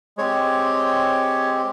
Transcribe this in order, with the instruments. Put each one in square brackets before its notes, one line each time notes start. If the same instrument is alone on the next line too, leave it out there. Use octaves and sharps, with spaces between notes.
[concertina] G#3 C4 G4 C#5